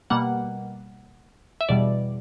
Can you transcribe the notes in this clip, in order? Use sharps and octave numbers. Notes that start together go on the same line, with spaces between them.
B2 G3 A#3 F#5
E5
E2 B2 G3 D5